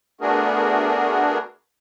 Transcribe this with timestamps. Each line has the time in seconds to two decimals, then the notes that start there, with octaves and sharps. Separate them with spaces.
0.21 A3 B3 D4 F#4 G#4 A#4